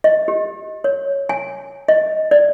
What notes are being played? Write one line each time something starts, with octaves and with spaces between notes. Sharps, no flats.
D#5
G4
C#5
G#5
D#5
D5